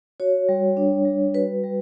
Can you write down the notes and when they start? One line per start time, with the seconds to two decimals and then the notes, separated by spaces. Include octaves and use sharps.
0.20 F#4 C#5
0.49 G3
0.77 D4
1.05 G3
1.34 F#4 B4
1.64 G3